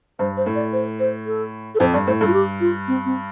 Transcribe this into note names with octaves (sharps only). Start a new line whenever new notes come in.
G2 C5
C5
A2
D5
C5
C5
A4
A4
F2 C5
G2 D5
A2 C5
G2 A4
F4
G4
F4
C4
C4